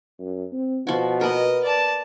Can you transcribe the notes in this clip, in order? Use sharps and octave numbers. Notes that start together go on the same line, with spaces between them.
F#2
C4
B2 F3 F#4
B3 A#4 D#5
D5 A5